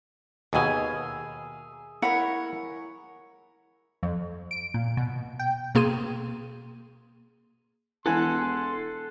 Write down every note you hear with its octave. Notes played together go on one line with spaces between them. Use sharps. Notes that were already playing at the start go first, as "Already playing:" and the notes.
D#2 B2 G#4 A#4 E5 G#5
E4 A#4 C#5 F#5 B5
F2
D7
A#2
B2
G5
B2 A#3 G#4 C6 D#7
E1 E3 A4 F#5 G#5 C6